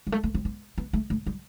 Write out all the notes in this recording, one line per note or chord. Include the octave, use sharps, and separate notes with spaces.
G3
A3
A3
C4
B3
B3
A3
A3
G3